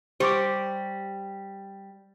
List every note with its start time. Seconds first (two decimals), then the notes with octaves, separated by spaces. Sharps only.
0.20 G3 G4 C5 C#6 D6